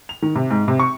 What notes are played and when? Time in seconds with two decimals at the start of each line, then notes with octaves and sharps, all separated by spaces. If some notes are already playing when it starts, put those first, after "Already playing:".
0.09 F7
0.22 D#3
0.35 C3
0.50 G#2
0.68 C3
0.80 C#6